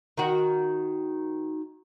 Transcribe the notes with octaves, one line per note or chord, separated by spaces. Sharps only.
D#3 F#4